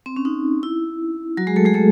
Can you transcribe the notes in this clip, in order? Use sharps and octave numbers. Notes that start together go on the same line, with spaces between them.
C4
C#4
D#4
E4
F#3 F#4
G#3 G#4
A3 A4
G#3 G#4
A3 A4